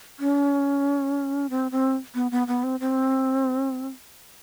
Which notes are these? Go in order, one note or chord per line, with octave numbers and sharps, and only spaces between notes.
C#4
C4
C4
B3
B3
B3
C4
C4